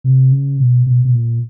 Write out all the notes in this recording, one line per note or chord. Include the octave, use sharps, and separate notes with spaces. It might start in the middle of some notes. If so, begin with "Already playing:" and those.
C3
C#3
B2
B2
B2
A#2